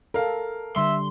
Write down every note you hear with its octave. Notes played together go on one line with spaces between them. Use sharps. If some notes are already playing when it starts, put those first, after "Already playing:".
A4 A#4 F5
D3 G3 E5 C6